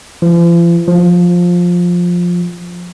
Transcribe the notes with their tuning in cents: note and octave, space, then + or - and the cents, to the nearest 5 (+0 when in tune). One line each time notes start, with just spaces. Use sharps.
F3 -45
F3 +10